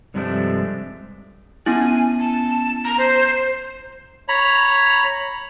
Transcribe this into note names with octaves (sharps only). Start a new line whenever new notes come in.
G2 C3 F3 G#3 A3 D4
B3 C#4 E4 G#5
A5
A#5
C5
C#5 A#5 B5